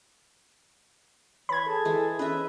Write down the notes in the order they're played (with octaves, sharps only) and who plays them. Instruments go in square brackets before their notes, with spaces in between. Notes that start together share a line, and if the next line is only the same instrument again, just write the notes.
[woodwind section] E3 [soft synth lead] C#5 [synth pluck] B5 G#6
[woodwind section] G#4 A5 [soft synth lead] A4
[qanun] E3 G#3
[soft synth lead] C#4 [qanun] B4 D#5 E5